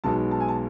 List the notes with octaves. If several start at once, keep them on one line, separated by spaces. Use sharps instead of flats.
B1 B2 G#3 B3 D#4 A5
A5
G#5
A5